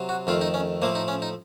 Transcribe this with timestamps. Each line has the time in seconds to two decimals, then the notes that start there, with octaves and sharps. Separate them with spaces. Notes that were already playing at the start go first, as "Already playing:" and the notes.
Already playing: C3 F#3
0.09 F#4
0.27 F2 D#3 A3 F4
0.41 D#4
0.54 C#4
0.82 A2 F3 A3 A#3
0.95 D#4
1.08 C#4
1.22 D#4